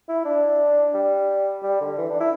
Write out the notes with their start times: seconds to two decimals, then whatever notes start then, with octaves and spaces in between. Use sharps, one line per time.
0.09 E4
0.25 D4
0.94 G3
1.63 G3
1.81 D3
1.98 E3
2.10 D4
2.20 E4